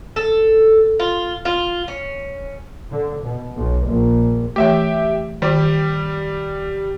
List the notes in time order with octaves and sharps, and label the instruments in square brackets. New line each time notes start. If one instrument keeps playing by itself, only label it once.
[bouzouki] A4
F4
F4
C#4
[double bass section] D3
B2
B1
A#1
[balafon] E3 A3 [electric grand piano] G4 E5 G5
[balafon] D#3 [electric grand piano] G3 G4